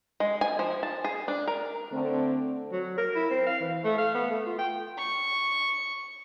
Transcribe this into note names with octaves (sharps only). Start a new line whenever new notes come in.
G#3
G#5
F3
A5
G#4
D4
A#4
D3 A3 C4
F#3
A#4
E4
C4
F5
E3
A3
F5
B3
A3
F4
G5
C#6